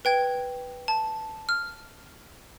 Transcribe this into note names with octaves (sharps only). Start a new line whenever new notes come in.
B4 G5 G#6
A5
F6